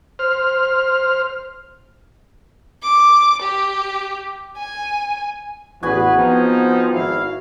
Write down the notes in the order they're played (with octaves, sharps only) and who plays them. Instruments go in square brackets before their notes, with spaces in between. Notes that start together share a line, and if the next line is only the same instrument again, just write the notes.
[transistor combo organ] C5 F6
[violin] D6
G4
G#5
[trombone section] A1 E2 [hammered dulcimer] F#4 G#4 G#5 [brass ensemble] B4
[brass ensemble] F3 D#4 [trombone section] B3 C4
[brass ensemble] G#1 E4 F5